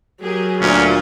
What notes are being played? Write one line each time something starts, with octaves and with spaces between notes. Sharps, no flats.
F#3 G4 G#4 A#4
D2 A#2 C#4 D4 F4